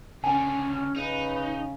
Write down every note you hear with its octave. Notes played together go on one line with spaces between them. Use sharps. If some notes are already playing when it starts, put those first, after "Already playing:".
C#2 D3 C#4 G#5
C#3 D#4 B4